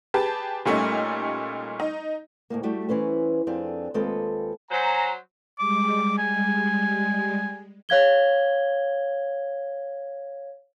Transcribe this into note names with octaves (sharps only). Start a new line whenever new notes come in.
G4 G#4 B4 A5
A#2 G3 A3 C#4 D#4
D#4
D2 A2 C3 A#3
G3 A3 F#4 G4
E3 C#4 B4 C5
F2 C4 D4 G#4
D#2 G#3 C4 F4 A4 B4
F#3 C5 G#5 A#5
G3 G#3 D6
G#5
C#5 F5 G#6 G7